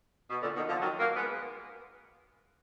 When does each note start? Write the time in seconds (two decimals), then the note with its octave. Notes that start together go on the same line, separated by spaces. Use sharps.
0.30 B2
0.42 A#2 D3
0.56 B2 D#3
0.69 D3 F3
0.82 D#3 F#3
1.00 F#3 A#3
1.16 G#3 B3